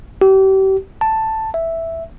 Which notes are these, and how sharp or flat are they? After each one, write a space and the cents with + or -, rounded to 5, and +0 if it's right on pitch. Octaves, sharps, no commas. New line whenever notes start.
G4 -35
A5 +5
E5 +0